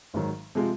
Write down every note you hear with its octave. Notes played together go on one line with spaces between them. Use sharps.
G#1 G#2 D#3 F#3
C3 F3 G#3